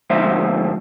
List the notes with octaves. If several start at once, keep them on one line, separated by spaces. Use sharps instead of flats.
D2 G#2 F3 C5 E5